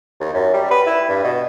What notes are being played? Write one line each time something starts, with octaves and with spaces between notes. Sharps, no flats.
D#2
F#2
G3
B4
E4
G2
B2